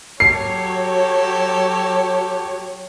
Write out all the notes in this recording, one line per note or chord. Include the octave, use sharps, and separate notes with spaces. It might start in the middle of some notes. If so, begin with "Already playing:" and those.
F#3 G4 A4 C#5 C7